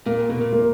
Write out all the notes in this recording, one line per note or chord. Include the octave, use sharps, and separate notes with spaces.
A#2 A#3
B2 A#3
A#2
A#3